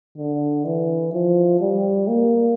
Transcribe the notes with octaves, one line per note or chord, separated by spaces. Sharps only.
D3
E3
F3
G3
A#3